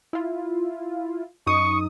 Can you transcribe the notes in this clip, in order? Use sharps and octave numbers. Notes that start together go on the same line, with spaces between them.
E4 F4
F#2 D#4 C#6 D#6